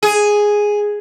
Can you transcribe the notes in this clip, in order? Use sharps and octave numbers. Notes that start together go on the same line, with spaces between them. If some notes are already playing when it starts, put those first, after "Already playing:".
G#4